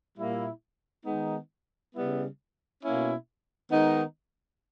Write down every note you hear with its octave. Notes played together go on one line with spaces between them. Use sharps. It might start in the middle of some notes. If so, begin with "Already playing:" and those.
A#2 G3 A#3 E4
D#3 G#3 B3 D#4
C#3 G3 B3 E4
B2 A#3 C#4 E4
D#3 G#3 B3 D#4